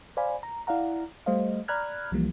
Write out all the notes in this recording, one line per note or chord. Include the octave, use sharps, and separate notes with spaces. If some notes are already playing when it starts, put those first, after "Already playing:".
C5 D5 F5 G#5 B5
A#5
E4 D5 F5 F#5 A#5
G3 A3 C5 D#5 F5
D5 A#5 B5 F6 F#6 G#6
C2 E3 F3 G3 A#3